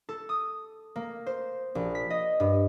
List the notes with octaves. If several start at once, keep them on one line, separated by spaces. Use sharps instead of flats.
A4
D#6
A#3
C5
A#1
B6
D#5
G2